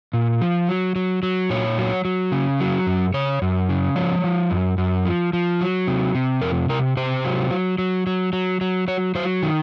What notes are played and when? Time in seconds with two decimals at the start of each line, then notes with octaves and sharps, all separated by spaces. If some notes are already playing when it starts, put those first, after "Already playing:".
0.13 A#2
0.42 F3
0.69 F#3
0.96 F#3
1.23 F#3
1.50 A#2 C#5
1.78 F#3
2.05 F#3
2.32 C#3
2.60 F#3
2.87 F#2
3.14 C#3 C#5
3.42 F#2
3.69 C#3
3.96 F3 C#5
4.24 F3
4.51 F#2
4.78 F#2
5.05 F3
5.33 F3
5.61 F#3
5.87 C3
6.15 C3
6.42 F2 A#4
6.69 C3 A#4
6.97 C3 C5
7.25 F#3
7.51 F#3
7.78 F#3
8.07 F#3
8.33 F#3
8.61 F#3
8.88 F#3 C#5
9.15 F#3 C5
9.43 D#3